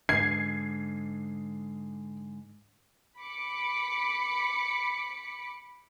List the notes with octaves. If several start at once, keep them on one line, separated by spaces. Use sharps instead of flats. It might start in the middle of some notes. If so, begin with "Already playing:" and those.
G#2 D3 G#6 C7
B5 D6 B6 C#7